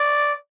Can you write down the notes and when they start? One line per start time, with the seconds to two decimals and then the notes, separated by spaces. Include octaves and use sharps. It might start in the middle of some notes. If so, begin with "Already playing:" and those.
Already playing: D5